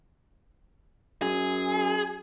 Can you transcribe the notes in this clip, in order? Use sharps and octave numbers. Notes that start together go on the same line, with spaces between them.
F#2 G#4